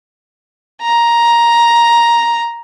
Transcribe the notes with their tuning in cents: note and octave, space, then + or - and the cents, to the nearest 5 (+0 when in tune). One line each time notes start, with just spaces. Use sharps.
A#5 +10